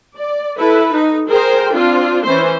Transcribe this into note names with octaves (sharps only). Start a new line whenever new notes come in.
D5
E4 A4 B4
D#4
G#4 A#4 C5 G5
C4 D4 F4
E3 C#4 C5